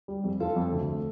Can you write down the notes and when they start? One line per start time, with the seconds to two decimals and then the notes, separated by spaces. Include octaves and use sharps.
0.08 G3
0.24 F2
0.40 F4 A4
0.56 F2
0.72 D2
0.89 A3